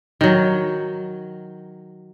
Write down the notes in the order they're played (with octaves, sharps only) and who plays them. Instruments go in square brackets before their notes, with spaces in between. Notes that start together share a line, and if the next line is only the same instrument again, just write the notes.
[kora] D#3 F#3